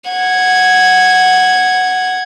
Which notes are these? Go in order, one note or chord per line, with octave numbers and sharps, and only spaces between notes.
F#5 G#6